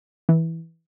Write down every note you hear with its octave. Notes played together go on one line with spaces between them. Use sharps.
E3